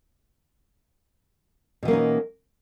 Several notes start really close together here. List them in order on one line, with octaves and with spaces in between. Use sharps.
B2 E3 A#3 C#4 D#4